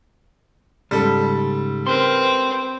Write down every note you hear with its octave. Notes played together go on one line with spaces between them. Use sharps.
G#2 C#3 G3 A4
C4 A#4 B4 C6